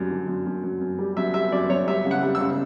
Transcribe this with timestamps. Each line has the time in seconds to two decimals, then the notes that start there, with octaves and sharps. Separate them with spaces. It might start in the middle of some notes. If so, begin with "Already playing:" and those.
Already playing: F#2 G3
0.10 D3
0.28 F#2
0.46 F#2
0.63 F#2
0.81 F#2
0.99 G3
1.16 F#2 E5
1.34 G3 E5
1.52 F#2 D5
1.69 F#2 C#5
1.87 G3 E5
2.05 C#3
2.11 F#5
2.23 G3
2.35 E6
2.41 C#3